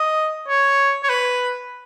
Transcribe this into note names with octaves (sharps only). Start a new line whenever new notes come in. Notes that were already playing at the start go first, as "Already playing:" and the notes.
Already playing: D#5
C#5
C#5
B4